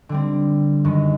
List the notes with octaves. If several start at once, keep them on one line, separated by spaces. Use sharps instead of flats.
D3 G3 C4
F#2 D#3 G#3